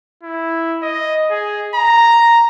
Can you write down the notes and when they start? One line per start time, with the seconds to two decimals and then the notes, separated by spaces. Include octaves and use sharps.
0.23 E4
0.82 D#5
1.30 G#4
1.75 A#5